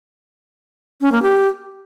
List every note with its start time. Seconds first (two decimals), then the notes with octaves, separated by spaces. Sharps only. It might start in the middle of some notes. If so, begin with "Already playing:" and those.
1.01 C#4
1.12 A#3
1.22 G4